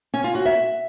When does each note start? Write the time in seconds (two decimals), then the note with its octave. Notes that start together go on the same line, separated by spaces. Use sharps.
0.14 C#4
0.24 F4
0.35 F#4
0.45 E5